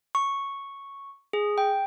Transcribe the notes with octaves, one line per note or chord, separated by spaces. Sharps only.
C#6
G#4
G5